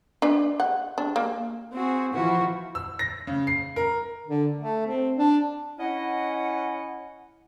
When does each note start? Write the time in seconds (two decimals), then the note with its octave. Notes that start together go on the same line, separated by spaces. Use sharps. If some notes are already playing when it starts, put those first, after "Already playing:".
0.22 D4 B4
0.60 F#5
0.98 D4
1.16 A#3
1.73 C4 F#4 G#4
2.14 E3 F3 E4 F#4
2.75 E6
2.99 A#6
3.27 C#3
3.47 C7
3.76 A#4
4.27 D3
4.58 A3
4.87 C4
5.17 D4
5.78 C#4 E4 D#5 F#5